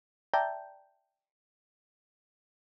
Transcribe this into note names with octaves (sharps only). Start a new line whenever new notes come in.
D5 E5 G5 A5 A#5 G6